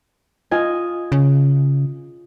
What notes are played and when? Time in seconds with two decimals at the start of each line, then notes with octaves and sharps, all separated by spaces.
0.51 F4 D#5 G#5
1.12 C#3